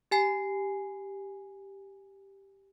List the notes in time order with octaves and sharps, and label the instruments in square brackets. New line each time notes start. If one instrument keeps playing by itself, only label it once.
[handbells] G4 G#5 C7